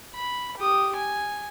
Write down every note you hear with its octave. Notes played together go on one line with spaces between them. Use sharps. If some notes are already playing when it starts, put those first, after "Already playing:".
B5
G4 D#6
G#5